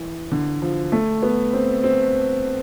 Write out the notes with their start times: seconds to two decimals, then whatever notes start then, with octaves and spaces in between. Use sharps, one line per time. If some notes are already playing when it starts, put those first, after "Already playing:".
Already playing: E3
0.32 D3
0.62 F3
0.92 A3
1.23 B3
1.53 C4
1.84 C4